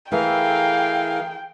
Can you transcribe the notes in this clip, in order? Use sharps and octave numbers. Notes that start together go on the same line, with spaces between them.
E3 A3 G#4 A#4 F5 G5